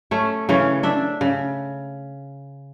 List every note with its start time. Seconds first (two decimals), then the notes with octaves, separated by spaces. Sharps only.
0.11 A3 C#4
0.49 C#3 E3 C#4
0.83 D4 E5
1.21 C#3